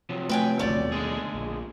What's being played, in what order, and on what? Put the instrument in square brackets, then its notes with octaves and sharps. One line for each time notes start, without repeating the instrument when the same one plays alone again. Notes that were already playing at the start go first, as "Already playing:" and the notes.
[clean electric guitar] C3 F3 F#3
[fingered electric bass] A3 [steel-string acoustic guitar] B4 G5 G#5
[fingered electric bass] G#1 C#2 D3 [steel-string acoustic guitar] A3 D5
[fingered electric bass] D#2 B2
[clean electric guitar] D3 G#3 G#4
[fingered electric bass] A#1